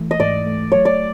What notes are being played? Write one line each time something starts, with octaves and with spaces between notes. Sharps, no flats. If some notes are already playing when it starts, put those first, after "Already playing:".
Already playing: E3 A3
D#5
G#2 D5
A3
F#3 C#5
D5